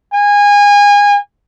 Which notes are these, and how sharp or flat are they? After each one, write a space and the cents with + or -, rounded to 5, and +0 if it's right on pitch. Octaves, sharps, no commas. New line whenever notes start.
G#5 -25